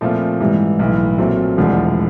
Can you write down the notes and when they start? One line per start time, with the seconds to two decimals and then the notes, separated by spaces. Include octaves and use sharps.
0.01 A#2 F3 A3 C4 F4
0.40 G#2 E3 G3
0.79 B1 A2 E3
1.18 A#2 F#3 A3 C4
1.57 E1 D2 D3 F3 G#3